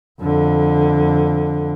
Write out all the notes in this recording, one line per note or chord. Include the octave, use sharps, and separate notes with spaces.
F2 D3